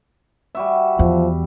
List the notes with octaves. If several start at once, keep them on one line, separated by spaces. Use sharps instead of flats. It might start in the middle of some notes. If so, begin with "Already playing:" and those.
G3 F#4 E5
E2 F3